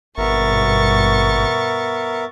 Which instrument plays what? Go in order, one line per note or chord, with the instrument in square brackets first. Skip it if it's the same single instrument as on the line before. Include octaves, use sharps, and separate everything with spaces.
[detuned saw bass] G#1 [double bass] G2 B2 [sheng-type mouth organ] B3 A#4 E5 [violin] C#6 A6